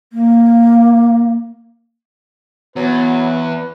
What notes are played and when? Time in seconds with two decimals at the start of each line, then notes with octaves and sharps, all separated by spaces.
0.13 A#3
2.76 E2 F#3 B3 B4